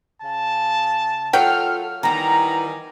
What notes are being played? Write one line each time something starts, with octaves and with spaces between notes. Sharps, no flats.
C#3 A5
F#3 F4 A4 G5 F6
D#3 E3 G3 B3 G#5 A#5